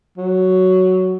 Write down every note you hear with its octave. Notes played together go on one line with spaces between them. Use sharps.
F#3